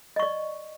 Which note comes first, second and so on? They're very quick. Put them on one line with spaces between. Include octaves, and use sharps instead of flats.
D#5 C#6 D5